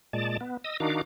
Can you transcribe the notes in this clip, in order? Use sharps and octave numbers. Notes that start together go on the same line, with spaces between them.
A#2 G#3 D5 A5
B3
D#5 D#6 E6
D#3 D4 D#4 F#4 F5 D6